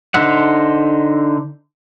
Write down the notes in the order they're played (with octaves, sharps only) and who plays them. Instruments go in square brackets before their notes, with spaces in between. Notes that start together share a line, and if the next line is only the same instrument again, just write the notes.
[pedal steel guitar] D3 D#4 C5 E5 F#5